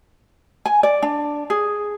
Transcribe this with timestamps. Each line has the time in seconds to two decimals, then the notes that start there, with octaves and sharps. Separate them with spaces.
0.66 G#5
0.83 D5
1.02 D4
1.50 G#4